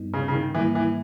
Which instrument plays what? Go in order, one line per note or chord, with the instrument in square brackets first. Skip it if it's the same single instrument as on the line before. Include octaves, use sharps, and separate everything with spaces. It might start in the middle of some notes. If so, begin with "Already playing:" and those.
Already playing: [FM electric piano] G2 G3 B3 D#4
[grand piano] C#3
C#3
D#3
[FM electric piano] G#2 D#3 G3 A#3 [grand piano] E3
[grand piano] E3